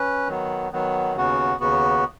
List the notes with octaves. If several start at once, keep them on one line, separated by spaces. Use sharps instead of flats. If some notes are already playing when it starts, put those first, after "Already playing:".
Already playing: C#4 B4
D#3 F#3 B3
D#3 F#3 B3
D#2 C#3 B3 F#4
D#2 C#3 B3 F#4